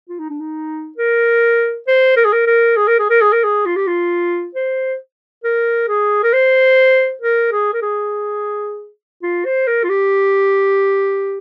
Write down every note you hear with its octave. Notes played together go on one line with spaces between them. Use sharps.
F4
D#4
D4
D#4
A#4
C5
A#4
G#4
A#4
A#4
G#4
A#4
G#4
A#4
G#4
A#4
G#4
F4
G4
F4
C5
A#4
G#4
A#4
C5
A#4
G#4
A#4
G#4
F4
C5
A#4
F4
G4